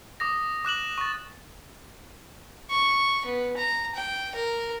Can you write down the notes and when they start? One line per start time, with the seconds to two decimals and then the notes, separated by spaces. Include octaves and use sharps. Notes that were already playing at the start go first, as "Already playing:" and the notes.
0.20 D6 D#6 A#6
0.65 D6 F#6 E7 F#7
0.98 C#6 A6
2.70 C#6
3.25 B3
3.57 A#5
3.95 G5
4.35 A#4